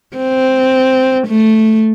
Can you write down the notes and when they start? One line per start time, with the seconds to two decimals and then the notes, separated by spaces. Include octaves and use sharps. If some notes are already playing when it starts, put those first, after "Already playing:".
0.16 C4
1.27 A3